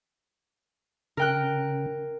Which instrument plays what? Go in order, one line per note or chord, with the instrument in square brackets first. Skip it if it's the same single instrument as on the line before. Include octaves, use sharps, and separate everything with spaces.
[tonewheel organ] C#3 [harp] A#4 G5 F#6